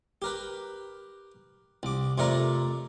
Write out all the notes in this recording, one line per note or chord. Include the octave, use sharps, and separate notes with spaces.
G4 A#4 B4
C2 D6
F2 C3 A3 A#4 D5 A#5